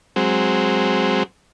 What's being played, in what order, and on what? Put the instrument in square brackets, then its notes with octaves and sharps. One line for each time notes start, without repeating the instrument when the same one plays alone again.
[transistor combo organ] F#3 G#3 C4